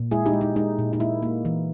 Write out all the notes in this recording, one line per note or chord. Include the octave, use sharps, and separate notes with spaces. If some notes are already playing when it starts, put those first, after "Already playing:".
Already playing: A#2
G#3 E4 G#4
D#4 G4
G#3
D#4
G#3 D#4
A#2
D#4
A#3 E4
A#3
E3